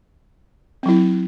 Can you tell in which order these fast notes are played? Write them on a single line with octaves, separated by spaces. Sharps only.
C4 F#3 E4